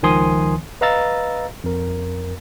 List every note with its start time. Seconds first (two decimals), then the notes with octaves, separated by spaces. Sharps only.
0.03 C#2 D#3 F3 G#5 C6 D#6
0.81 B4 D#5 F5 A#5 E6 A6
1.64 F2 A#4